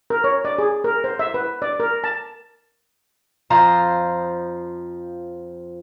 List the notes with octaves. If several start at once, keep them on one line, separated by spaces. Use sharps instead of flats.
A#4
C#5
D5
G#4
A#4
C5
E5
B4
D5
A#4
A5
F2 F3 C5 A#5